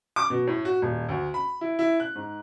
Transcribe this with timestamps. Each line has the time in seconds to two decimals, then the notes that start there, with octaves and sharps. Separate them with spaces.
0.16 D6
0.30 B2
0.47 A2
0.65 F#4
0.82 D#1
1.09 D2
1.34 B5
1.61 E4
1.79 E4
2.00 F#6
2.15 G#2